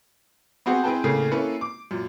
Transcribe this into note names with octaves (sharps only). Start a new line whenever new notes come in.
B3 C4 F#4 G#4
C4 E4 G#4 B4 G5 A5
A2 C#3 A3 A#3 G#4 C7
A#3 C#4 E4 A4 B4
D6
F#2 A#2